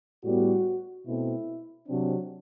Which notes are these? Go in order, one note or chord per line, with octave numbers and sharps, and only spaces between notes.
A2 G3 B3 F#4
B2 A3 C4 E4
C3 F#3 C4 D4